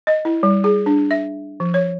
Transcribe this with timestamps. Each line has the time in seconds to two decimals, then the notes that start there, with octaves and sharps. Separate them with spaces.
0.07 D#5
0.25 E4
0.43 G3
0.64 G#4
0.86 D4
1.11 E5
1.60 F3
1.74 C#5